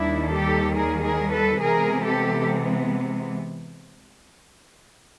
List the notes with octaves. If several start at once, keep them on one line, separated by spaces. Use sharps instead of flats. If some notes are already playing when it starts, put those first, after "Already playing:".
Already playing: D#2 D#3 G3 D4 E4
G4 A4
G#4 A#4
G#4 A#4
A4 B4
C3 E3 G#3 B3 G#4 A#4
G4 A4